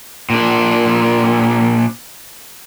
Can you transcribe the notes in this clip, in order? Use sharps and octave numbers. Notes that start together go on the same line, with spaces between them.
A#2 D4